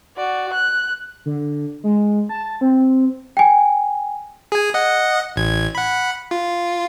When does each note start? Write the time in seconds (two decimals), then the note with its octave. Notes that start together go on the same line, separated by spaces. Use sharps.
0.17 F#4 D5
0.53 F#6
1.26 D3
1.84 G#3
2.29 A5
2.61 C4
3.37 G5 G#5
4.52 G#4 G#5
4.74 D#5 F#5
5.36 A1 G#6
5.75 F#5 B5
6.31 F4